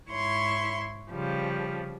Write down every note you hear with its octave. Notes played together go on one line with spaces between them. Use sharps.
G#2 E4 C#5 C6 C#6
C#3 F3 G3